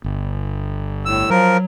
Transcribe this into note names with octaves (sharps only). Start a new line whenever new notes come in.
G1
A2 E6
F3 F#3 A#4